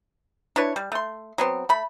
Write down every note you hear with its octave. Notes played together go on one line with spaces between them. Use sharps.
D4 E4 B4 C#5
G3
A3 C6
F#3 B3 C4
A3 B5